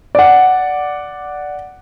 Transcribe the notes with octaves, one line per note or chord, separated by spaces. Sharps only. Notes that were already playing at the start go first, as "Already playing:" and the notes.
D5 F#5